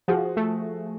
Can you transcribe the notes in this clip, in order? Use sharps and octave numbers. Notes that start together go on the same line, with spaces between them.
F3 F#4 G#4
A3